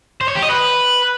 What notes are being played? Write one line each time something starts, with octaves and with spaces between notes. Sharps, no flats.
C5
C#5
G4
D#5
B4